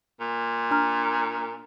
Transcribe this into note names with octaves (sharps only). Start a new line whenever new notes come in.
A#2
D4 A#5 F6